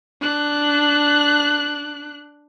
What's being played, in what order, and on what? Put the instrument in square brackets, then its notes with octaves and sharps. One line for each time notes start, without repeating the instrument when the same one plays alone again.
[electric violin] D4 F#6